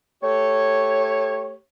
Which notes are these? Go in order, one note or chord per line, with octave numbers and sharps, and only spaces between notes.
A3 G4 C#5